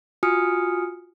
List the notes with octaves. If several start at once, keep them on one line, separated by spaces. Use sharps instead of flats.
F4 F#4 G#5 D#6 F6 C#7